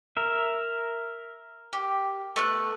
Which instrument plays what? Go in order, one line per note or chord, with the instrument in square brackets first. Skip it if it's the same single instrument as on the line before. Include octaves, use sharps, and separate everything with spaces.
[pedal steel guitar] A#4 E5
[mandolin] G4
A3 B3 F#6